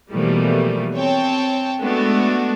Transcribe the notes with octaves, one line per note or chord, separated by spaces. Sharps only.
B2 E3 F3 G3 A3 A#3
C4 C#5 G5 A5
G#3 A3 B3 D4 F#4 A4